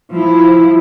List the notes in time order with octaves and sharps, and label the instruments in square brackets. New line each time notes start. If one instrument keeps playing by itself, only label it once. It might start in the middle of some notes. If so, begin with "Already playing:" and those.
[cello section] F3 E4